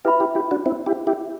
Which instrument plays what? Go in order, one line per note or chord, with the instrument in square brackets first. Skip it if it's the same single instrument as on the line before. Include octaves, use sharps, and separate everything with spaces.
[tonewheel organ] E4 G4 [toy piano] B4 E5 B5
[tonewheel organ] E4 G4
E4 G4
D4 F#4
C4 E4
E4 G4
E4 G4